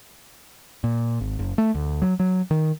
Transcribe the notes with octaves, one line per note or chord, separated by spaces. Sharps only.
A#2
G#1
F#1
A3
D2
F#3
F#3
D#3